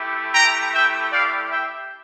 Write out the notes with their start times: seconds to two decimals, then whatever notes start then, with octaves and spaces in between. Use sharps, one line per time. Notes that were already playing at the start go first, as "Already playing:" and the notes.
Already playing: A3 E4 G4
0.33 G5 A#5
0.73 E5 G5
1.11 D5 F5
1.52 E5 G5